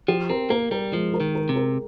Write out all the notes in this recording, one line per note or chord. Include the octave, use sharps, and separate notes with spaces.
F3 G4
C4 A#4
A#3 A#4
G3 A#4
F3 G#3
A#4
D#3
A#4
C3
A#4